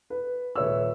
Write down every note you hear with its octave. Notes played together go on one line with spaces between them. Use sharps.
B4
D#1 B4 C#5 E5 E6